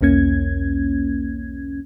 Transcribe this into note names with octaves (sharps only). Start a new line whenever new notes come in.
B1 E2 A#3 C#4 G#6